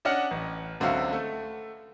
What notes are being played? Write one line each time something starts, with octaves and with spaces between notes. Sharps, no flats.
C#4 D4 D#5 F#5 F6 C#7
A1
C#2 D3 F#3 C4 E5 F5
A3